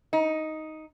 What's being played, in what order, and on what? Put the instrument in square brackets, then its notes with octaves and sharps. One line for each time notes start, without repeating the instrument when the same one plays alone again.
[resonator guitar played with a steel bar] D#4